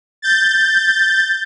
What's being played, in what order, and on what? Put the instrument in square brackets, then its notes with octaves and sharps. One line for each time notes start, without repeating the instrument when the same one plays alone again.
[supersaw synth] G6 A6